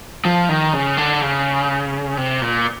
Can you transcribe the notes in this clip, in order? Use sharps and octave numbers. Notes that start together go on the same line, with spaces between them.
F3
D#3
C#3
D3
C#3
C3
A#2